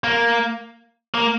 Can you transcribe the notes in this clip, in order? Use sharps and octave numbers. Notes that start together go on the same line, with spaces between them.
A#3
A#3